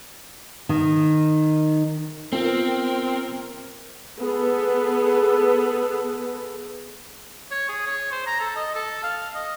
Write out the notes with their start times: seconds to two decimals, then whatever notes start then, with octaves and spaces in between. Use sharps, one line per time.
0.69 D#3
2.33 B3 C4 F4 A#4
4.19 B3 G#4 A4 B4
7.51 C#5
7.69 G#4
7.86 C#5
8.11 C5
8.26 A#5
8.40 A4
8.56 D#5
8.75 A4
9.03 F5
9.35 D#5